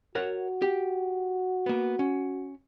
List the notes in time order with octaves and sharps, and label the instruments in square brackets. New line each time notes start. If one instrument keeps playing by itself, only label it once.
[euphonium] F#4 [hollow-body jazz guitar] A#4 C#5 F#5
[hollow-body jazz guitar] G4
A#3 B3
C#4